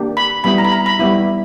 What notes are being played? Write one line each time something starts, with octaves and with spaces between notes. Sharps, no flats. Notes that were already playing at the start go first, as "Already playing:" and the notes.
Already playing: A#3 D4 G4
B5
G3 B3 E4 B5
A#5
B5
A#5
B5
G3 B3 E4